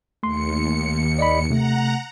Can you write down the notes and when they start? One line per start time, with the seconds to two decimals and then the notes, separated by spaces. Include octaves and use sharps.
0.23 D#2 A3 C6 C#7
1.19 D5 D#5 B5
1.50 C3 A3 F#5 A#5